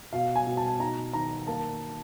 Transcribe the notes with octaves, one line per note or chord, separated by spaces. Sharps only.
B2 F5
G#5
B2
A5
D#4 A#5
D#3 A#5
A#3 A5